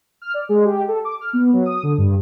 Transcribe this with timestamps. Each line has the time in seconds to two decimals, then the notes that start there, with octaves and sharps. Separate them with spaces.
0.22 F6
0.34 D5
0.49 G#3
0.65 G4
0.88 A4
1.05 D6
1.21 F6
1.33 B3
1.53 F#3
1.65 D#6
1.83 D3
1.98 G2